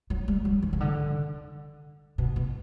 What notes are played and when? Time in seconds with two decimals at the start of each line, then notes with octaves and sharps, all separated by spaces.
0.10 F#3
0.28 G3
0.45 F#3
0.62 E3
0.73 C#3
0.80 D3
2.18 B2
2.36 B2